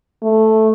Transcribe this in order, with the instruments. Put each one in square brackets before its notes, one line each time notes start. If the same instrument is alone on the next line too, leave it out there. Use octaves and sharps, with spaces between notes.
[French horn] A3